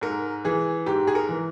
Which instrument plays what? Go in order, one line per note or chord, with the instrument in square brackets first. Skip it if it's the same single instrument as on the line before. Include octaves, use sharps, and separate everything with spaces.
[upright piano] G#2 A#4
E3 G#4
G#2 G4
G#4
A#4
E3